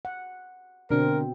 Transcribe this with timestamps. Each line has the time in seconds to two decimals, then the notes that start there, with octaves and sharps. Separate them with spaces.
0.05 F#5
0.90 B2 D3 C4 D4 A#4